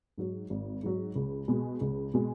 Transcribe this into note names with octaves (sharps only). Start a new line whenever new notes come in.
G#2 F#3
G#1
G#2 F#3
C#2
B2 G#3
C#2
B2 G#3